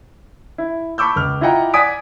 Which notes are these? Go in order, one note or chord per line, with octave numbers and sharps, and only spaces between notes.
E4
A5 B5 C#6 D6 E6 G6
C#2 F6
E4 F4 D#5 F#5 G5 A#5
D5 F#5 G#5 D#6 B6 D7